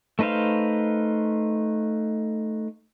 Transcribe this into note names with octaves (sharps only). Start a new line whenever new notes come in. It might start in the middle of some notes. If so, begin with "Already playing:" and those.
A3 D#4 B4 C5 F5